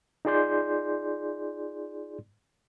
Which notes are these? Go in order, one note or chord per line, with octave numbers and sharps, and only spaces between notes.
D#4 F4 G#4 D5 C6 G6